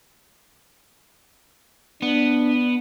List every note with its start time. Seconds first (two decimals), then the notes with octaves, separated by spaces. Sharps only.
2.02 B3 D4